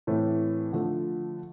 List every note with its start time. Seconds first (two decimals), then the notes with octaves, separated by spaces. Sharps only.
0.07 A2 E3 A3 C4
0.72 D3 F3 A3